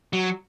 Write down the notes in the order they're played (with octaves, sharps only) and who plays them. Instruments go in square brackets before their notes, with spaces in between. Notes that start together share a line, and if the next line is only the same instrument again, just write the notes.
[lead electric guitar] F#3